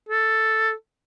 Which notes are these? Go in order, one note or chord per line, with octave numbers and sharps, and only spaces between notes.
A4